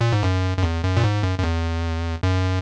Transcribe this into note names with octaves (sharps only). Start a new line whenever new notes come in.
A#2
G#2
F#2
F#2
E2
F#2
A#2
G#2
F#2
F#2
E2
F#2